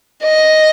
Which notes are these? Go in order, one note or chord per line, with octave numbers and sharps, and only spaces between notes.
D#5